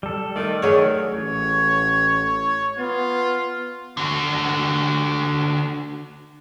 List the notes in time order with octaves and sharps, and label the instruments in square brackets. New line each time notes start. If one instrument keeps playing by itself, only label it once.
[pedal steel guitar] G3 A4
[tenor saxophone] D#3 [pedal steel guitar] A3 D5
[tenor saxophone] D#3 [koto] F#3 C#5 [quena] G#4
[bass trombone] A1 [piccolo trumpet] C#5
[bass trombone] B3 [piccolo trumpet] F4
[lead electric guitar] D3 F#4